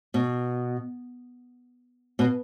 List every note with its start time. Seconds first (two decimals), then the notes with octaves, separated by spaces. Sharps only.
0.14 B2
2.19 B2